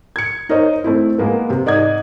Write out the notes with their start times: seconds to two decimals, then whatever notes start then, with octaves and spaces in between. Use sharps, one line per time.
0.16 G#6 C#7
0.49 D#4 A#4 C5 C#5 D#5
0.84 A3 C4 E4
1.18 G#3 A#3 B3
1.50 C3
1.66 G#2 D5 D#5 D#6 G#6